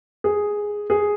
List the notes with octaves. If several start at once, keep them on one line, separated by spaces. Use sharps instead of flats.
G#4
G#4